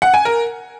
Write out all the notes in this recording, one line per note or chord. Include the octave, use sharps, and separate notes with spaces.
F#5
G#5
A#4